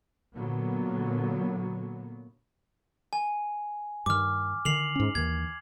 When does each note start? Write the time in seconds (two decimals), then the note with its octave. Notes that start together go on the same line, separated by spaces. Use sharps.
0.36 A#2 D3 F#3 A#3 B3
3.13 G#5
4.06 G2 D#3 D6 F6
4.65 D3 D#3 C7 F7 F#7
4.96 G#2 C#4
5.15 D#2 D#3 E3 G#6